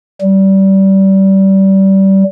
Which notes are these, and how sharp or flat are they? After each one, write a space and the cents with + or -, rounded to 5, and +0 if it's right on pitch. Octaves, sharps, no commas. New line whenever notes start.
G3 -25